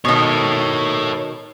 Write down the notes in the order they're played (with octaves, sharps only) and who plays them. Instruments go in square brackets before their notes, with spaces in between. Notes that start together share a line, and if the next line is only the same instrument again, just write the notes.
[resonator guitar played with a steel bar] B2 D#3 [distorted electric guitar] A4 C#5